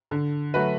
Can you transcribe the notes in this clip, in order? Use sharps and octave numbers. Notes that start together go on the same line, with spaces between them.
D3
F#3 A3 F#4 B4